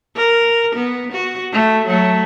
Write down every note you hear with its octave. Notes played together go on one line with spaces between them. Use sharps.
A#4
B3
F#4
A3
F#3 A3